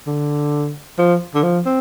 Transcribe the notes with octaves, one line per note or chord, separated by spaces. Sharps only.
D3
F3
D3
F3
C4